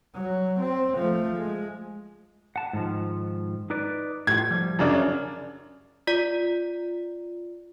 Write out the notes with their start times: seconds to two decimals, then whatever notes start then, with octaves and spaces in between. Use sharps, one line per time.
0.14 F#3
0.60 C4
0.96 F3 A3
1.37 G#3
2.56 F#5 A5
2.73 G#2 D#3 F3
3.70 D#4 B4 D5
4.27 A2 F4 G#6
4.51 F3 G3
4.79 F#2 C#3 D4
6.07 F4 D5